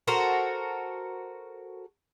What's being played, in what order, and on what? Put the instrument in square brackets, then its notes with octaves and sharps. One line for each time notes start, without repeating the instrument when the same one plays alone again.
[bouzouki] F#4 A4 A#4 C5